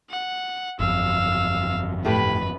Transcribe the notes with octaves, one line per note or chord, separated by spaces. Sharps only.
F#5
G1 F2 F5 E6
A2 A3 G4 B4 B5